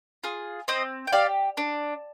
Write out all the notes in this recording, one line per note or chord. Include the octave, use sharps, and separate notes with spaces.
F4 G#4
C4 C5 D#5
G5
G4 D5 F5
D4